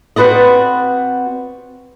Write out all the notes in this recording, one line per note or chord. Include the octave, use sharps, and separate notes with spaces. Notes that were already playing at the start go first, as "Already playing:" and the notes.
C4 F#4 B4 D5 D#5